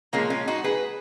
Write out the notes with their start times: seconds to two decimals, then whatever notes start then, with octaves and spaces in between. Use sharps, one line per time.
0.13 A#2 F3 G#3 A#3 C#4
0.30 C#4 F4
0.47 D#4 F#4
0.64 G#4 B4